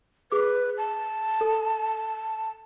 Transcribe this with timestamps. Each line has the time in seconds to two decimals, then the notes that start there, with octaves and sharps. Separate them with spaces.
0.32 G#4 B4 D6
0.78 A5
1.41 A4